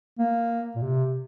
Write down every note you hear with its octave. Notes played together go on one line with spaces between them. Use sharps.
A#3
A#2
C3